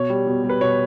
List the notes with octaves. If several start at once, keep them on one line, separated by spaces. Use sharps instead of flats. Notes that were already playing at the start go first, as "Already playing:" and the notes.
Already playing: B2 C#5
G3
B2
G3
B4
B2 C#5